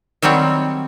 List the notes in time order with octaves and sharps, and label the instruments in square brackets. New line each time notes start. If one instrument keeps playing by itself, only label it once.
[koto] D#3 F#3 G3 C4 C#5